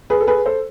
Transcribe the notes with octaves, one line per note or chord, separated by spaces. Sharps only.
G#4 B4
A4
G#4 B4
A4 C5